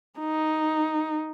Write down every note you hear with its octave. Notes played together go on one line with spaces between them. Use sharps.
D#4